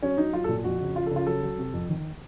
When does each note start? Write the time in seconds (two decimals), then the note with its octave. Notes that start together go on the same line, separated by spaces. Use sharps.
0.03 F#3 C#4
0.18 F#3 D#4
0.33 F#3 F4
0.44 A4
0.49 A#2
0.64 F2 F#4
0.80 C#3
0.96 F3 F4
1.07 A4
1.11 C#3 F4
1.27 F#3 A4
1.42 F#3
1.58 C3
1.73 F2
1.89 D#3